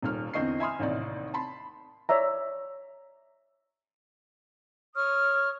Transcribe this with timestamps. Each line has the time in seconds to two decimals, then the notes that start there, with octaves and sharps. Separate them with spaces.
0.02 D#1 D#2 F6
0.34 E2 D3 C4 D#5 C#6 C7
0.60 E5 G#5 B5 C6 D#6 F6
0.79 A1 D#2 C3 D#4 D5
1.34 A5 B5 C6
2.09 C#5 D5 E5 A#5
4.95 C#5 C#6 D#6 F6